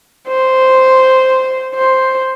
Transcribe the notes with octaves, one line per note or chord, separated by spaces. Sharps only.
C5
C5